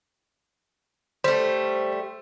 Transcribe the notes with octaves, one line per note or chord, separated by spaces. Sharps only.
G3 A3 C5